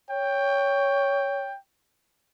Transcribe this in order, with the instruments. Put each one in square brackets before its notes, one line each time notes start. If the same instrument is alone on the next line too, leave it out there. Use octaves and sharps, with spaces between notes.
[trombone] C#5 [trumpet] G5